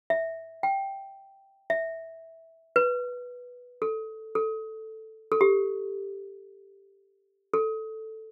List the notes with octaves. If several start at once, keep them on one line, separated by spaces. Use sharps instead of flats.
E5
G5
E5
B4
A4
A4
A4
G4
A4